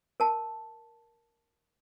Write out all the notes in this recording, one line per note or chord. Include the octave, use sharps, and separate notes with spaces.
A#4 A5